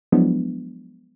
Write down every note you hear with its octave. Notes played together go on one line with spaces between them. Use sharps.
F3 F#3 G#3 B3 D4 E4